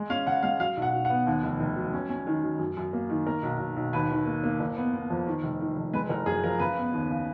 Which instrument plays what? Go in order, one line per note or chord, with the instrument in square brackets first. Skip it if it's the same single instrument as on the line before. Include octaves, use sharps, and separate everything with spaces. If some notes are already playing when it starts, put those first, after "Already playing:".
Already playing: [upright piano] G#3
C#4 F5
C#3 F#5
G#3 F5
F#3 F5
B1
F#5
B1
F#5
B3
D#2
F1
F1
F#3
C#4
C#4
D#3
F#3
F#2
F#2
A#3
D#3
A#3 A#4
B1
B1
B1
D#2 B4
D#3
A#3
A#3
F#1
B3
B3
F2
D#3
F1
D#3
F1
G#3 B4
F#1 A#4
F#2 G#4
F3 A#4
C#3 B4
B3
D#2
C#3